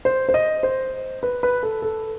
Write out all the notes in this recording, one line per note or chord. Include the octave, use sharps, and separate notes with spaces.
C5
C5
D#5
C5
B4
B4
A4
A4